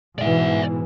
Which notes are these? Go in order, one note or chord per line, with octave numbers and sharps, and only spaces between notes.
G#2 B2 E3 D5 E5